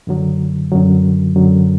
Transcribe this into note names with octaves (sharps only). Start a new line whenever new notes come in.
F#2 D3 F#3
F#2 D3 F#3
F#2 D3 F#3